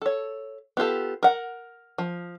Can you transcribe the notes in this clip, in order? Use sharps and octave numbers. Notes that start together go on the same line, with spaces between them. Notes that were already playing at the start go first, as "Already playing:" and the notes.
A4 C#5
B3 F4 G4 A4
A#4 F#5
F3